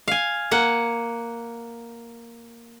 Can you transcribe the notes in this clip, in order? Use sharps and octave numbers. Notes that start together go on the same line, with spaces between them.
F5 G#5
A#3 F#5